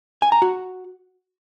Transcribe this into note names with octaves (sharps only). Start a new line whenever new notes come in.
G#5
A#5
F#4